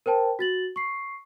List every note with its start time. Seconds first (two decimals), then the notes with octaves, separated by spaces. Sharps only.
0.06 A#4 C5 G5 A5
0.39 F#4 A6 F#7
0.76 C#6 C7